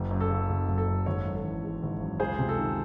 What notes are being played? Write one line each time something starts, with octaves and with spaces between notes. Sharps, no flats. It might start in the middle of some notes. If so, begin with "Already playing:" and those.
Already playing: F#1
F#2
A4
C#3
F#1
F#1
A4
F#2
G#1 A4 C#5
F#2
A4
E3
G#3
G#1
F#2
C#2 G#4 C5
C3
A4
D#3